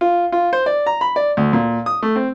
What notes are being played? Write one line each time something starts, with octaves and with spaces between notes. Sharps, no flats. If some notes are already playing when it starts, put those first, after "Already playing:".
F4
F4
C5
D5
A#5
B5
D5
D2
A#2
D#6
A3
C4